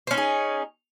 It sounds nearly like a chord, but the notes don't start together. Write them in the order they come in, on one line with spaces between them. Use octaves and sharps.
C5 C#4 D#4 G#4